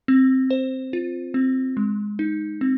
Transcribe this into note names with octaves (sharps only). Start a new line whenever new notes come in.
C4
C5
F4
C4
G#3
D#4
C4